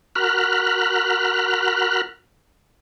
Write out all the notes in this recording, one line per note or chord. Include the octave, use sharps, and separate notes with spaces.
F#4 A#4 B5 F6 F#6